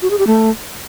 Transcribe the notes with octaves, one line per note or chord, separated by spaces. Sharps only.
F#4
G#4
G4
A3